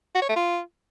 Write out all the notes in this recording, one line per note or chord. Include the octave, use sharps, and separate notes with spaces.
F#4
C#5
A3
F4